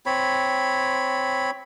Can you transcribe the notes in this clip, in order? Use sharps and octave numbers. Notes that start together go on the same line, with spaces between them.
C4 C#5 B5